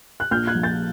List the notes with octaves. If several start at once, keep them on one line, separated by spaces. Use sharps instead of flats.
F#6
A#1 F6 G6
F#6 G#6
F3
G6 A6